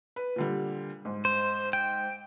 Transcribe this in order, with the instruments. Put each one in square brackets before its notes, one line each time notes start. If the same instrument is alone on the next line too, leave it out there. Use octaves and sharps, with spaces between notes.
[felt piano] B4
A#2 D3 G3
G#2
[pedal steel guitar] C5
G5